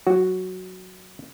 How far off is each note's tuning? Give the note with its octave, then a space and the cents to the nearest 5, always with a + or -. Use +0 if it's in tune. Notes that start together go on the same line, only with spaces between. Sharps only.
F#3 +0 F#4 +0